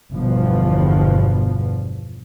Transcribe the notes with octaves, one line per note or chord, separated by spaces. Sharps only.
G1 E2 G2 B2 F3